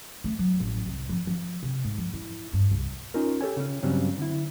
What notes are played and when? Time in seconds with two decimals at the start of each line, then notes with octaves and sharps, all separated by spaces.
0.24 A3
0.39 F#3
0.60 A1
0.86 C2
1.09 F3
1.27 F3
1.63 C3
1.84 G#2
1.98 F3
2.13 E4
2.53 G2
2.71 C2
3.14 C#4 D#4 F4 A#4
3.41 G4 A4 C#5 G#5
3.56 C#3 C#4
3.82 G2 C#3 F#3 G3 C4 D4
4.18 D3 E4